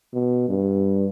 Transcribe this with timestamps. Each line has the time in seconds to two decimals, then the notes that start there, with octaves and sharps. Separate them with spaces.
0.14 B2
0.49 G2